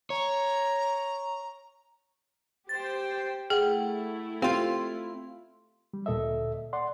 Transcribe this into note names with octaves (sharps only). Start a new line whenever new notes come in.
C#5 A#5
G4 C5 G5 A6
A3 E4 G#4 F#5 G5
C4 F4 G4 F5 C6
G3
D2 A#2 A4 D#5 E5
D5 F#5 C6